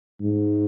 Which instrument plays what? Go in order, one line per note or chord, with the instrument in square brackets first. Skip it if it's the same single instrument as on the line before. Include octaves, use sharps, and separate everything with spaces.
[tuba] G#2